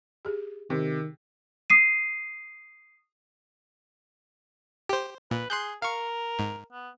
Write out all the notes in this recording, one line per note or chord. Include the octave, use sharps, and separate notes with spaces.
G4 G#4
C3 D#3
D#6 C7 D#7
G4 C5
A#2 B4
G#4 C6 F#6 G6
A#4 F5 C#6
G#2
B3